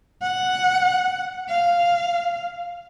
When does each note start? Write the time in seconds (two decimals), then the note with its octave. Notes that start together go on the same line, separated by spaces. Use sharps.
0.22 F#5
1.49 F5